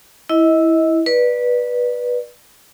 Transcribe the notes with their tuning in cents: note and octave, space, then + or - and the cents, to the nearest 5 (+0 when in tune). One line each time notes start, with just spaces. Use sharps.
E4 -5 D#5 +30
B4 -15 D5 +20